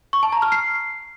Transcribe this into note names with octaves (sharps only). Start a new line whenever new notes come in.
C#6
A5
A#5
F6
C7